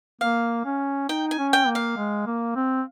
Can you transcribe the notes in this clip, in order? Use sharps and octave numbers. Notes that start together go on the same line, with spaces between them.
A#3 F5
C#4
D#4 G5
G#5
C#4
G5
A#3
F5
G#3
A#3
C4